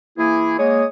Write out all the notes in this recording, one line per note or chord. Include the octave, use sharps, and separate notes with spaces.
E3 A#3 E4 G#4
G#3 A#3 C#5 D#6